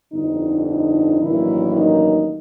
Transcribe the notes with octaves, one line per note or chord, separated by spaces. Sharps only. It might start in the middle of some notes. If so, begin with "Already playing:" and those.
G1 F2 D3 D#4
D#4
A1 G2 D#3 F#3 A#3 E4
D#4